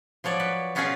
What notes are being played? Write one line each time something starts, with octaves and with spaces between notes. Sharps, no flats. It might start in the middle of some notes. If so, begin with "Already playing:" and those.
F3 F#3 C#5 D5
B4
B2 B3 C#4 F4 G#4 A#4